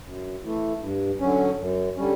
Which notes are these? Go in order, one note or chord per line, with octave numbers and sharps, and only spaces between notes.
F#2
E3 A3
G2
D3 F#3 C#4
F#2
D3 G3 C#4